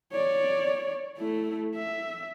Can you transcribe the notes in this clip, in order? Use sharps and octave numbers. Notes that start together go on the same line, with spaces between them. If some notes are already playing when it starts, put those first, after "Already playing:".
C#5 D5
A3 E4
E5